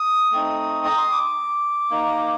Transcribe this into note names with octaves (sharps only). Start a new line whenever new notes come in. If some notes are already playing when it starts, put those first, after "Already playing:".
Already playing: D#6
A3 C4 D#4
A#5
C6
D6
A#3 D#4